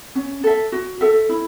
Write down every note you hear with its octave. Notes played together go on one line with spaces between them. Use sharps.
C#4
A4 E5
F#4
A4 E5
E4